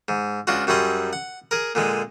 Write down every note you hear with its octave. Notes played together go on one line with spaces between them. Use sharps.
G#2
C#2 D4 F4 F#4
F#2 F#3 G3 G#4 C6
F#5
G#4 A#4
A#2 D3 G#3